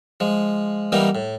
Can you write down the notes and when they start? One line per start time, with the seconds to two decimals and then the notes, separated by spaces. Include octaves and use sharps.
0.20 F3 G#3
0.92 E3 G3 A#3 B3 D#4
1.15 A2